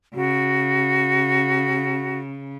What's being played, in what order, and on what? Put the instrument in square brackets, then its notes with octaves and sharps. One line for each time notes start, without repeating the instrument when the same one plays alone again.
[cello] C#3 [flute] F#4